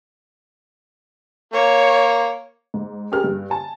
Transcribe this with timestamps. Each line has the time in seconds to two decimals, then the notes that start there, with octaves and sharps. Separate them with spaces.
1.54 A#3 C#5
2.74 G#2
3.12 G4 G#4 A#4 F6
3.24 G2
3.50 G#5 A5